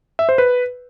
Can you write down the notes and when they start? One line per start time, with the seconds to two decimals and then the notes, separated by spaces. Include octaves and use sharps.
0.19 E5
0.29 C5
0.38 B4